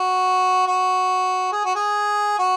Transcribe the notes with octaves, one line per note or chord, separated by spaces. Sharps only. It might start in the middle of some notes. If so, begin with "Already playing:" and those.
Already playing: F#4
F#4
G#4
F#4
G#4
F#4